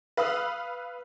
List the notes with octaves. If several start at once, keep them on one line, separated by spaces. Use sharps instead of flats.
B4 F5 B5 D#6 E6 F#6